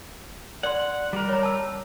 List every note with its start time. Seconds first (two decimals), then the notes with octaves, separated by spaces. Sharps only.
0.63 D5 F#5 C6
1.13 G3 A#4
1.29 C#5 A#5
1.43 A5 E6